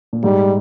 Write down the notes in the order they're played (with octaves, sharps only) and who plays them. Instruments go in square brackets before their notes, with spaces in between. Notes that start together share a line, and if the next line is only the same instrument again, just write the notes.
[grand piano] A#2
[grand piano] G#2 [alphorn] G3